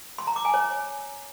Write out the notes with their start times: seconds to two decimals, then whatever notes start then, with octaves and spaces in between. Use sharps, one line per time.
0.18 C6
0.27 A#5
0.36 D6
0.45 G#5
0.54 C#5